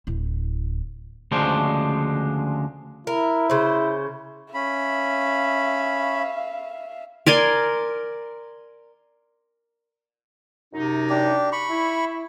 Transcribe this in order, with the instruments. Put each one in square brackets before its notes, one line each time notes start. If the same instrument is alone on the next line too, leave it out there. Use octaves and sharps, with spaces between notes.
[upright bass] D1 E4
[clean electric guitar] D2 C#3 F3 G#3 D4 C5
[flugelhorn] E4 [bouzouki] A#4
[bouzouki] C#3 C5
[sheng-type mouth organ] C#4 B5 [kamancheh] E5 F5
[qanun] A#4 D5 G#5 C6
[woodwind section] F#2 C3 D#4
[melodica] D4 G4
B5 C#6
[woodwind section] E4